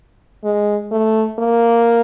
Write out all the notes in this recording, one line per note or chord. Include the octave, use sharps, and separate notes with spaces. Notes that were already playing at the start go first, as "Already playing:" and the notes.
G#3
A3
A#3